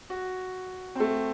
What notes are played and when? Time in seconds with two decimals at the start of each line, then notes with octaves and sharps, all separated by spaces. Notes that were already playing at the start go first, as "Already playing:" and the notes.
0.10 F#4
0.95 C4
1.00 A3